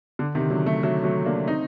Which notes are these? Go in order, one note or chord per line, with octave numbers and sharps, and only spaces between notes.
D3
C3 D#3
D3 F#3
F#3 A3
F#3 A3
F#3 A3
A#3 D4
C4 D#4